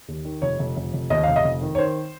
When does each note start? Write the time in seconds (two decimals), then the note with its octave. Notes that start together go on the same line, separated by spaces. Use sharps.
0.08 D#2
0.25 D#3
0.42 F1 C#5
0.59 F1
0.77 F1
0.93 F1
1.10 D#2 D#5
1.23 F1 F5
1.36 D#5
1.44 F1
1.61 D#3
1.75 C#5
1.78 D#3 C5